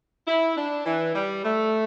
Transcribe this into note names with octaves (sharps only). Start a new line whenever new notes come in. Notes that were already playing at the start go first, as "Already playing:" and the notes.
E4
D4
E3
G3
A3